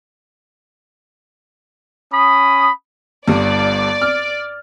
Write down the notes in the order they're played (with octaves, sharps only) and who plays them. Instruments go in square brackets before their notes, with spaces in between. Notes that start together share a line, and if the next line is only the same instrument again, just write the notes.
[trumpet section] C#4 B5 D#6
[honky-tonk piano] G1 G2 [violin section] D5
[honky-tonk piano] F6